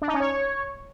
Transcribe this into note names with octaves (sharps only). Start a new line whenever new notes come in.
D4
D#4
C#4
C#5